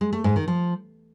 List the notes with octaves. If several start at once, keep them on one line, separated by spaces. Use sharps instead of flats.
G#3
A3
G#2
D#3
F3